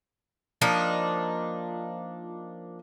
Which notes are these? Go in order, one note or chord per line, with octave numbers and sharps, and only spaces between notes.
F3 A#3 D4 D#4